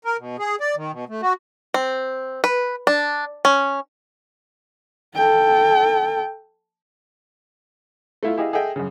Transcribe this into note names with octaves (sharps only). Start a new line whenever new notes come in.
A#4
B2
G#4
D5
D#3
B2
A3
F#4
C4
B4
D4
C#4
A4 G5
A3 E4 F4
E4 G4 G#4 D#5 F5
G#4 A4 D#5 E5 G5
F#2 C#3